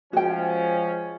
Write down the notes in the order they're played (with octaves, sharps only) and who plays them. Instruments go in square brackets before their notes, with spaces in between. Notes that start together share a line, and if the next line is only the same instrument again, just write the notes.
[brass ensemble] F3 G#3 C#4 [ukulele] F#4 G5